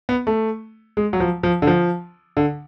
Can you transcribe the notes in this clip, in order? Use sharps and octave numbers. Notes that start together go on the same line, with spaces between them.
B3
A3
G#3
F#3
F3
F3
D3
F3
D3